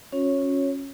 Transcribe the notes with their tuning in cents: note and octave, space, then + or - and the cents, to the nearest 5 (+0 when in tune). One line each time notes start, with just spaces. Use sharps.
C#4 -10 F#4 -45 C#5 -5